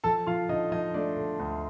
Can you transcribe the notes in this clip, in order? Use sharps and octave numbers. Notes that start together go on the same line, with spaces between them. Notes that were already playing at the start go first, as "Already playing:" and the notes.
F3 A4 A5
F3 F4 F5
D3 D#4 D#5
F3 D#4 D#5
A3 D4 D5
D3
D2